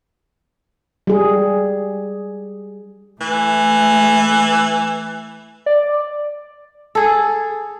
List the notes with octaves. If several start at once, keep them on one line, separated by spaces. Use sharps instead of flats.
G3 G#4
E3 A3
D5
G#4 A4